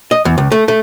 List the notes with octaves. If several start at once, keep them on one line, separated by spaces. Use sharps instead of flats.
D#5
E2
C#2
A3
A3